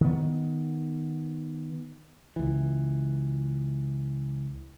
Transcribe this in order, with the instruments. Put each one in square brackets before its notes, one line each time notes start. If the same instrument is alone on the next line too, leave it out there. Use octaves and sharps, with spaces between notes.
[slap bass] D#3 B3
[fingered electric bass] C#2 E3